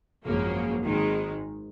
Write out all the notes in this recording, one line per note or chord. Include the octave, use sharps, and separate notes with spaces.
G#1 F#2 C#3 F3 A#3
G#1 G#2 D#3 G#3